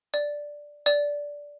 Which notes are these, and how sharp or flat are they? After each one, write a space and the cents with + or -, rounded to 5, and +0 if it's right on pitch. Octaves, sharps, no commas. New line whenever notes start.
D5 +0
D5 -10